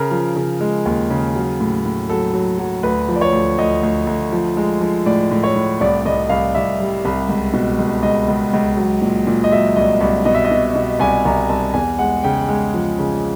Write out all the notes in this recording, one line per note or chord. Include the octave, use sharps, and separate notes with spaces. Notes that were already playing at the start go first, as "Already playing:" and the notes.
Already playing: C#3 A#4
F3
C#3
G#3
D#2
C#3
F#3
A2
A2
F#3 A4
F#3
F#3
D2 B4
F3
D5
C#5
D2
D2 D#5
D2
D2
F3
G#3
F3
A2 D5
A2
C#5
A2
C2 D5
C2 D#5
C2 F5
C2 E5
G3
C2
C#2
B2
C#2
C#2 D#5
C#2
C#2
F#3
A#2
A#2
D#5
F#3 E5
C2 D#5
C2
B2 D#5
E5
D#5
B2
B2
C2 G#5
C2 A#5
C2 A5
E2 G#5
G#3 F#5
C#3 G5
G#3
F3
C#3